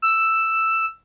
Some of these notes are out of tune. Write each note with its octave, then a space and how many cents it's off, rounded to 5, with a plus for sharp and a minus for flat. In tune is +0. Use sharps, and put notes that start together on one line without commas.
E6 +5